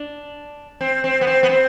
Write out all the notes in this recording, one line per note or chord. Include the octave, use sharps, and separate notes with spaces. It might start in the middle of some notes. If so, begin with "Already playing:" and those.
Already playing: D4
C4
C4
B3
C4
B3
C4